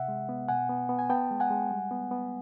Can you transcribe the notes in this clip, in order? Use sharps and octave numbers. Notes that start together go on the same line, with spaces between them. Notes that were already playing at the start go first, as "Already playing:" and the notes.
Already playing: C3 E5 F#5
G#3
B3
B2 F#5 G#5
B3
B3
G#5
B3 G5 A5
G#3
F#5 G#5
G#3
G3
B3
B3